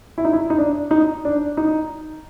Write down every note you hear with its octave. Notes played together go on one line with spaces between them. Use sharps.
E4
D#4
E4
D#4
D4
D#4
D4
D#4